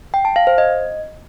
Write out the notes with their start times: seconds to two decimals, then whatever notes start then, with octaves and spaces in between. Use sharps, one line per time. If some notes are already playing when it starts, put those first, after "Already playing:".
0.14 G5
0.25 A5
0.36 F5
0.47 C5
0.58 D#5